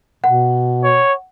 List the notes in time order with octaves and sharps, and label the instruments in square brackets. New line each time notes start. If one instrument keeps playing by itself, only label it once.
[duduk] B2 [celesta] F#5
[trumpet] C#5